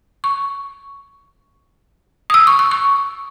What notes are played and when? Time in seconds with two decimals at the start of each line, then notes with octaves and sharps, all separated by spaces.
0.24 C#6
2.30 D#6
2.34 E6
2.47 C#6
2.59 C#6
2.71 C#6